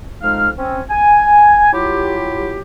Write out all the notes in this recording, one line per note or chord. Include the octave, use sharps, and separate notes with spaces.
F2 G#3 D#4 F5 F6
C4 C#4
G#5
F#3 E4 F4 G4